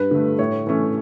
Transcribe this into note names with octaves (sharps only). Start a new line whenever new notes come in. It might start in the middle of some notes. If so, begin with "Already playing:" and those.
Already playing: G2 B4
D3 A3
A2 C#5
E3 A3 C#4